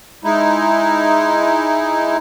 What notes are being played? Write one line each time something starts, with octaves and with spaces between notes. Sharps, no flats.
G#3 D#4 E4